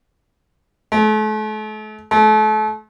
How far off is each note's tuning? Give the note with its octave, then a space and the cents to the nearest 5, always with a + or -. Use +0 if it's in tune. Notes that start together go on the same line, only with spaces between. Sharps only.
A3 -40
A3 -35